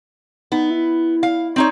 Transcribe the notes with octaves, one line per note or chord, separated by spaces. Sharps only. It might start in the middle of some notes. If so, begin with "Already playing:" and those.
B3 D#4
E4
F5
C4 D#4 C#5